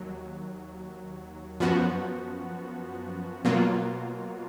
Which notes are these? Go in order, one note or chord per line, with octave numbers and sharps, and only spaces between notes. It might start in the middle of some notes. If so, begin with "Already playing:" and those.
Already playing: D#2 F#3
F#2 F3 B3 F#4
B2 F#3 A#3 F4